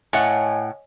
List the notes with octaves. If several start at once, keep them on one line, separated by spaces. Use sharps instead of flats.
A2 C#5 D#5 F#5 G#5